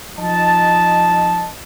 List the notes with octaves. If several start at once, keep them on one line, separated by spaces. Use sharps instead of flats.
F3 D#4 D#5 A5